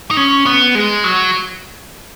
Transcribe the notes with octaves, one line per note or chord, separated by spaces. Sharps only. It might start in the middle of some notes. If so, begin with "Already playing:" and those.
D#4
C#4
B3
G#3
F#3